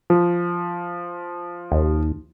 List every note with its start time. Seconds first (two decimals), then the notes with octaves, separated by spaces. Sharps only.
0.10 F3
1.72 D#2